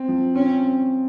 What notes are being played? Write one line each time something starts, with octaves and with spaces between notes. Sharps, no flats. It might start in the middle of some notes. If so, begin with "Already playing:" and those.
Already playing: C4
F3
C4 C#4
C4